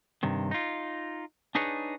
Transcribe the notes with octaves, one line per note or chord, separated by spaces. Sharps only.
G2 C3 D#3
D#4 F4
D4 D#4 G#4 B4 C#5